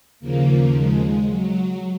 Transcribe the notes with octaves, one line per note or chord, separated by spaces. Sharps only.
D#2 C#3 F3 A#3
G#3
F#3